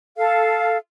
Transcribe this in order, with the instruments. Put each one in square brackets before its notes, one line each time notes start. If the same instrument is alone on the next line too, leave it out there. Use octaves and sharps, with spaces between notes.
[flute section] A4 F5